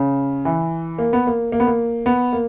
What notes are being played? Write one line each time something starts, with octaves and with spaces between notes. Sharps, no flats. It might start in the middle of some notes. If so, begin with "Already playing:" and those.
Already playing: C#3
E3
A#3
B3
A#3
A#3
B3
A#3
B3
A#3